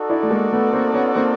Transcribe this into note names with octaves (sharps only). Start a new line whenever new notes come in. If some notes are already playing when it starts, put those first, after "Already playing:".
Already playing: D#4 F#4 A4 D5
D4 E4
A3
G#3 A#3
A3 B3
A#3 C4
B3 C#4
A#3 C4